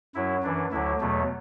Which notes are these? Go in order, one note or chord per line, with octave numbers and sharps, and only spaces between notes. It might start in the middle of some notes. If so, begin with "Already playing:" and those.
F#2 F#3 E4
F#2 E3 D4
D2 D3 F#3 E4
E2 B2 F#3 A3